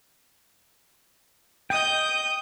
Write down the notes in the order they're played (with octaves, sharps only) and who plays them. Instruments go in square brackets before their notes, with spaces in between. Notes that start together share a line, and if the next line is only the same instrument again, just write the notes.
[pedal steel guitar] D#5 G5 [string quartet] D#6 G6